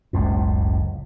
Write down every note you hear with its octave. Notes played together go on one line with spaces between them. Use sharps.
F#1 C#2 A2